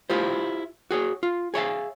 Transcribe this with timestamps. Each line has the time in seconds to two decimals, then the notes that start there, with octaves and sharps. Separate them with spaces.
0.10 E4 F4 G4 C5
0.91 F#4 G#4 C#5
1.23 F4
1.54 G#4 C#5 E5 F5